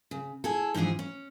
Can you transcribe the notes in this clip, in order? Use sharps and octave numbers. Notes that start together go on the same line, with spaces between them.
C#3
E4 G#4 A4
G#2 E3 F3 D4 G#4
C#4